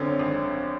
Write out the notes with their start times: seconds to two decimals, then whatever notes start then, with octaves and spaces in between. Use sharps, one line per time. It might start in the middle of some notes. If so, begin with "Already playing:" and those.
Already playing: G#1 F#2 D3 C4 C#4
0.19 G#1